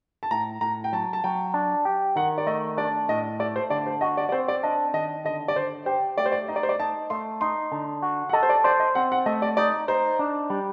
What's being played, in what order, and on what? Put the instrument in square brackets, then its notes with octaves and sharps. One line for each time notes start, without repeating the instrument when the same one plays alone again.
[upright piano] A5
[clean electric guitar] A2 [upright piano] A#5
[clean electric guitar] A2 [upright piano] A#5
[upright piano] G5
[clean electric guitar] F#3 [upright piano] A5
[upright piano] A5
[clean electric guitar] F#3 [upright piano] G5
[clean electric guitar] D4
G4
[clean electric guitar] D#3 [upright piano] F#5
[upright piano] D5
[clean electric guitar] A3 [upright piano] D#5
[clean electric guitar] D4 [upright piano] D5
[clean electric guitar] A2 [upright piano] D#5
[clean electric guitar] A3 [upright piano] D5
[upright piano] C5
[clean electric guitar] D3 [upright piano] D5
[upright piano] C5
[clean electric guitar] F#4 [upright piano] D#5
[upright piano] D5
D5
[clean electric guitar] C4 [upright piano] C5
[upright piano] D5
[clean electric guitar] D4 [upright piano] D#5
[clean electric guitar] D#3 [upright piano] D#5
[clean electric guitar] D3 [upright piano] D#5
[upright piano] D5
[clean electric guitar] D3 [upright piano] C5
[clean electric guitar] G4 [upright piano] C5
[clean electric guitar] A3 [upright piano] D5
[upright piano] C5
D5
[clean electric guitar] D#4 [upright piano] D#5
[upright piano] D5
C5
D5
[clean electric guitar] D#4 [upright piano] A5
[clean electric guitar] A3 [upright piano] C6
[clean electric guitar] D#4 [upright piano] C6
[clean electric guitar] D3
F#4
[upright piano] F#5
[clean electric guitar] A4 [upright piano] D#5
[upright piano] C5
D5
[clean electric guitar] C5 [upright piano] D5
[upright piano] D#5
[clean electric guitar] C4 [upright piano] F#5
[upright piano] F#5
[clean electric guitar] A3 [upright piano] D#5
[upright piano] D5
[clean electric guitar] D#4 [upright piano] D5
[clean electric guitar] D#4 [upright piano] C5
[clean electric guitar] D4
G3